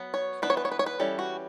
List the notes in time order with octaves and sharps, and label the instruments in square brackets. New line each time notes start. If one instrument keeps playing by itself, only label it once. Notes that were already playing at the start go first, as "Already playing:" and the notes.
Already playing: [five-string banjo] F#3 B3
C#5
E3 B3 D4 B4
C#5
B4
C#5
B4
C#5
B4
E3 G3 C#4 A4
F#4